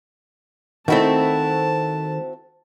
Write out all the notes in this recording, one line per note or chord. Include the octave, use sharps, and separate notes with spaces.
D#3 A3 C4 E4 F#4 A5